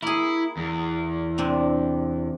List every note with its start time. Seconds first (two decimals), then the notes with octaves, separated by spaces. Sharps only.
0.02 A#3 E4 G#4
0.57 E2
1.38 C3 C4 D4